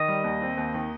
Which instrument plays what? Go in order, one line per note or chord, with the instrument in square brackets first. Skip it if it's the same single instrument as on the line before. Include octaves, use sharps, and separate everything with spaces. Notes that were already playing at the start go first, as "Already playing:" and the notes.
Already playing: [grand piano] D#3 [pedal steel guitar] D#5
[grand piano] G3
D#2
C4
D#2
D#3